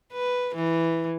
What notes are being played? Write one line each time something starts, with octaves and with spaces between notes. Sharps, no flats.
B4
E3